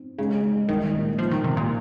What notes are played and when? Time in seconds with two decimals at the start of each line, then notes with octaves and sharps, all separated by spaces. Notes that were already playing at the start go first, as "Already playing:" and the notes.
Already playing: C4
0.18 C#3 G#3
0.43 G#3
0.69 C2 D#3
0.94 A#2
1.18 F3 A#3
1.31 D#3
1.44 C3 A#3
1.57 A#2